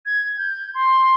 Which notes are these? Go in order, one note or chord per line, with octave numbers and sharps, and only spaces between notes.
G#6
G6
C6